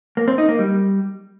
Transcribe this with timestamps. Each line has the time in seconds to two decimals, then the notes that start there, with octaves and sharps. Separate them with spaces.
0.17 A#3
0.28 C4
0.38 D#4
0.49 A#3
0.59 G3